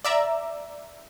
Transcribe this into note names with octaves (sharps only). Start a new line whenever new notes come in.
D5 E5 A#5